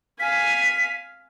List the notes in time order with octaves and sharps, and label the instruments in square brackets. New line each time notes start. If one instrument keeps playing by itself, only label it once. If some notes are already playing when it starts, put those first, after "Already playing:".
[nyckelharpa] F5 G#5 [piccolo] B6